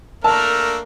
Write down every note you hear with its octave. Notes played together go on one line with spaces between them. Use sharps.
A3 A#3 D4 A#4 A5 E6